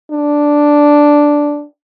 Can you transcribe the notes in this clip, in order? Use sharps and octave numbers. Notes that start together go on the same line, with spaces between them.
D4